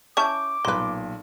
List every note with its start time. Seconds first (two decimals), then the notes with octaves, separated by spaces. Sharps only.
0.17 C#4 E4 A5 C#6 D6 G6
0.65 B1 A#2 A#3 B4 C6